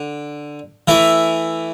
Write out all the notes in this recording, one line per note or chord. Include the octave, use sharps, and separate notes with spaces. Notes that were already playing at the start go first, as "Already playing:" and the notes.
Already playing: D3
E3 A3 E4